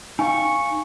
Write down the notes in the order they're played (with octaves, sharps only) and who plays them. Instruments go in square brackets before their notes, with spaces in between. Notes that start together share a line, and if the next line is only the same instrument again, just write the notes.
[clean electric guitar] D#4 F5 [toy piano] G5 G#5 [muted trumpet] C#6